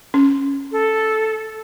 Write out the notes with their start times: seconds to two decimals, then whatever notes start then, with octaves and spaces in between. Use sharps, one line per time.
0.14 C#4
0.72 A4